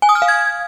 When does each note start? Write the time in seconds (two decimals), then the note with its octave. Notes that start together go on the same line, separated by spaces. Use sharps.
0.02 G#5
0.09 D#6
0.15 F6
0.22 F5
0.28 G#6